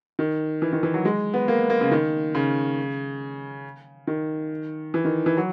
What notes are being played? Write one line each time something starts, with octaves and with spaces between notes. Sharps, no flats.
D#3
E3
D#3
E3
F#3
G#3
B3
A#3
A#3
C#3
D#3
C#3
D#3
E3
D#3
E3
F#3